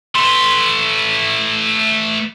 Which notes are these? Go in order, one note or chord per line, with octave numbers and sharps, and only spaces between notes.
A3 B4 C6